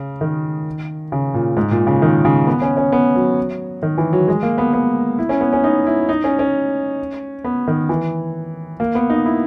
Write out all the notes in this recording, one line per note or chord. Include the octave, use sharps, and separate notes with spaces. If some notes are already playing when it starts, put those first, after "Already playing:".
Already playing: C#3
D#3
C#3
A#2
G#2
A#2
C#3
D#3
C#3
B3
C#4
C#4
B3
F#3
D#3
E3
F#3
G#3
A#3
B3
B3
E4
C#4
B3
C#4
D#4
E4
D#4
C#4
C#4
B3
D#3
E3
A#3
B3
D#4
E4